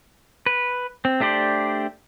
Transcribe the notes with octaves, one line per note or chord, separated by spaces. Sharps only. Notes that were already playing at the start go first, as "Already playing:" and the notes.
B4
C4
A3 D4 G4 C5 D5